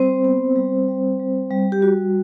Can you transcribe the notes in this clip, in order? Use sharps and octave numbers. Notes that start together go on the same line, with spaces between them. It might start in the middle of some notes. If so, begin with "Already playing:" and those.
Already playing: G3 C4 C5
B3
G3
G3
G3
G3
G4
G3 F#4